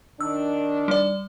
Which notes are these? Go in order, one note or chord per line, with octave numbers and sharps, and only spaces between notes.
D#3 D4 E6
G3 D5